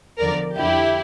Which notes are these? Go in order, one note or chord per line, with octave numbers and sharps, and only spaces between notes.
E2 D3 F3 A#4 D5
F2 D3 F3 E4 G4